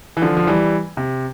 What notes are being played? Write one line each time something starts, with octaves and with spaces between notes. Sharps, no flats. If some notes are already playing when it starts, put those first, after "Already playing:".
E3
D3 F3
F3
E3 G3
C3